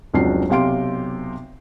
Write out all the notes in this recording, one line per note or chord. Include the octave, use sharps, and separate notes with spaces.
F1 C#2 F#3 D4 C7
B1 C3 G4 F5 C6 D7